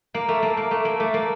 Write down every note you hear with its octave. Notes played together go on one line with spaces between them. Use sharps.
A#3
A3
A#3
A#3
A3
A#3
A3
A#3